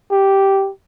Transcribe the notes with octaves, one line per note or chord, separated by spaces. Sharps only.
G4